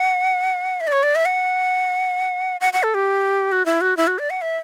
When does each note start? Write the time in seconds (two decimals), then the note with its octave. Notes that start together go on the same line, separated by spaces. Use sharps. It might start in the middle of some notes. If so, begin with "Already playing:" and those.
Already playing: F#5
0.81 E5
0.87 D5
0.92 C#5
1.03 D5
1.15 E5
1.25 F#5
2.61 F#5
2.73 F#5
2.83 A4
2.94 G4
3.52 F#4
3.66 E4
3.81 F#4
3.97 E4
4.07 F#4
4.19 D5
4.30 F#5
4.42 E5